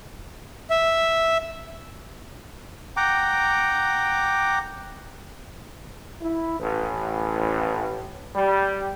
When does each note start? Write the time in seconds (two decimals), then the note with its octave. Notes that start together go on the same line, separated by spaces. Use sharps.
0.70 E5
2.97 F#5 G5 A#5 D6
6.21 E4
6.59 A1
8.35 G3